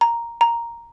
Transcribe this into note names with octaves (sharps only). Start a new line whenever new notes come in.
A#5
A#5